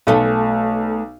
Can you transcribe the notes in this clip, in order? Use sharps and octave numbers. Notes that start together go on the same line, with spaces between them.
B1 A3 A4 D#5